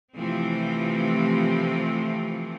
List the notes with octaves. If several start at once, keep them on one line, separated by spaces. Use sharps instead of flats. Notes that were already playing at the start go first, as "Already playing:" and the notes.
C3 E3 F3 A3 C4